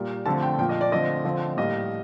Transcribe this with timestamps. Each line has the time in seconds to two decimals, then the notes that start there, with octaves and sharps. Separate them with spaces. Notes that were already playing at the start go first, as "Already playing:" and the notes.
Already playing: A#2 G3 A#3
0.26 D3 F3 A3 C4 A5
0.42 G5
0.58 A#2 F3 A#3 G5
0.69 D#5
0.81 D5
0.92 D3 F3 A3 C4 D#5
1.24 D3 F3 C4
1.57 A2 G3 A#3 D#5